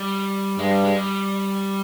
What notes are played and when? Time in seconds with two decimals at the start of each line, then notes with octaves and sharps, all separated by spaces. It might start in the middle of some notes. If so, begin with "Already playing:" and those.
Already playing: G3
0.59 G2 G#3
0.71 G3
0.84 G#3
0.96 G3